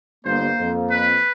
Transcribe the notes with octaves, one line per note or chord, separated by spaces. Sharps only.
G1 A#3 C5
F2
B4